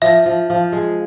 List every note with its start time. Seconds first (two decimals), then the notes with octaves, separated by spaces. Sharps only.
0.02 F3 E5
0.26 F3
0.50 F3
0.72 G#3